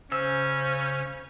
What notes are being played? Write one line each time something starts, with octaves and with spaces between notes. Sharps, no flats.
C#3 C#4 C5 E6